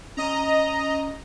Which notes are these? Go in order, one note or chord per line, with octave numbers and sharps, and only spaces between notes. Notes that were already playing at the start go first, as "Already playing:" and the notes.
C#4 D#5 A#5